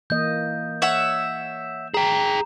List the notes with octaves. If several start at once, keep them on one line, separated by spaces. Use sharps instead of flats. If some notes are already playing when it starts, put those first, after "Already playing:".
E3 A#3 D#5 G6
C#5 E5 F#5 E7
G#4 G5 A#5